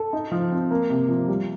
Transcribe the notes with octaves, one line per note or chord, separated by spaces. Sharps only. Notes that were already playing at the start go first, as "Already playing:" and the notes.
Already playing: A4
D#4
F3
C4
A#3
C3
F3
G3